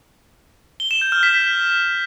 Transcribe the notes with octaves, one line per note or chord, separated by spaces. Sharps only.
G7
E7
G6
F6
B6